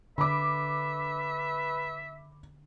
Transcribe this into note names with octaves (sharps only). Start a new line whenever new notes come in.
D3 B4 E5 B5 D6